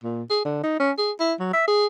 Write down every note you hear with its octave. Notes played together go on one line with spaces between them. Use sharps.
A#2
G#4
D3
D#4
C#4
G#4
E4
F#3
E5
G#4